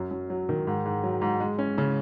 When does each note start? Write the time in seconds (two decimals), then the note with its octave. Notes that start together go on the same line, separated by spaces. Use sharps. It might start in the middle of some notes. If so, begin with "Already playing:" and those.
Already playing: F#2
0.11 F#2
0.30 F#3
0.49 D#3
0.67 G#2
0.85 G#2
1.03 F#3
1.22 G#2
1.40 G#3
1.58 C#4
1.78 C#3